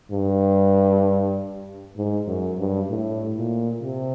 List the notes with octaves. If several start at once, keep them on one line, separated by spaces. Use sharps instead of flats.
G2
G#2
F#2
G2
A2
A#2
C3